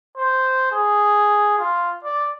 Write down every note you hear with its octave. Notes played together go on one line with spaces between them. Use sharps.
C5
G#4
F4
D5